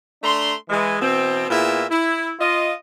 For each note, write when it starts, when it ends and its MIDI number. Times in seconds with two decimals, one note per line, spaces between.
0.23 0.54 57
0.23 0.54 62
0.23 0.54 82
0.23 0.54 84
0.69 0.99 52
0.69 0.99 56
1.00 1.47 47
1.00 1.47 52
1.00 1.47 60
1.49 1.84 46
1.49 1.84 59
1.49 1.84 64
1.49 1.84 68
1.49 1.84 76
1.90 2.31 64
2.39 2.73 65
2.39 2.73 75